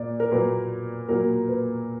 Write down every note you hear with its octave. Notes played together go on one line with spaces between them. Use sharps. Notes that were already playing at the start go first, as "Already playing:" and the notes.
Already playing: A#2 A#3 D5
A#4
A#2 F#3 A#3 B4
A#2 F#3 A#3 A#4
B4